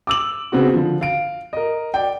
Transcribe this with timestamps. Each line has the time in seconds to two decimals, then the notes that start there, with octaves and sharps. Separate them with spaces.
0.07 D6 E6 F#7
0.52 C#3 B3 C4 F#4
0.74 D3 F3
1.01 F5 D7
1.53 A#4 D#5
1.94 D5 G5